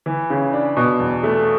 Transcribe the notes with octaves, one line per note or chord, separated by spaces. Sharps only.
E3
C#3
D4
B2
E2
A3